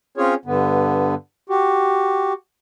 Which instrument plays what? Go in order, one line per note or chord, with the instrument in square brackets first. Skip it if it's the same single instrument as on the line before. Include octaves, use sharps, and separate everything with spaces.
[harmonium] C4 C#4 F4 G#4 C#5
G2 D3 B3
F#4 G4